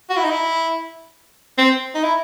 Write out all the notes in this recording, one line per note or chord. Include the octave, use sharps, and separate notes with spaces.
F#4
E4
D#4
E4
C4
D#4
E4